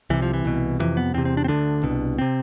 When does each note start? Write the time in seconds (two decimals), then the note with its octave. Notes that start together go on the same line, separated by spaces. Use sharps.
0.10 C2 C3 E3
0.22 F3
0.34 E3
0.45 C2 B2
0.79 F2 C3 E3
0.97 B3
1.14 E2 C4
1.18 C3
1.25 C4
1.37 D4
1.44 C4
1.48 D2 D3 D4
1.83 C2 B2
2.18 C3 C4